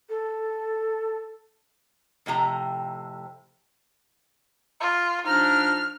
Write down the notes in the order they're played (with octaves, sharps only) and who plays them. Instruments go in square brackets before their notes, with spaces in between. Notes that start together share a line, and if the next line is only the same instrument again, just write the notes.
[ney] A4
[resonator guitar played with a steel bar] F2 A2 C3 A#5
[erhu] F4
[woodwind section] F3 D4 D#4 [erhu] F6